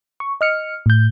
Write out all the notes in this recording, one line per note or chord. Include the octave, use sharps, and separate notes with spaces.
C#6
D#5 F6 C#7
A2 G6